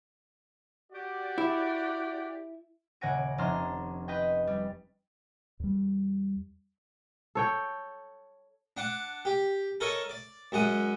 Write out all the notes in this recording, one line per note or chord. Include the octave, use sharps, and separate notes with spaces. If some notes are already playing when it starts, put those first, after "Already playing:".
F#4 G4 D5
E4
D#1 C#3 F#5 G#5 A#6 D7
F1 C#4 D4 A#5 C6 F6
B4 D#5 G5
G3
E2 G3
A4 C#5 G5
D4 F#5 D6
G4
A4 A#4 C#5 D#5
D5
F#2 G#3 F#5 D#6